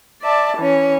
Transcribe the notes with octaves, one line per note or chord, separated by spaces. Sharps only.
D5 E5 A5
E3 C#4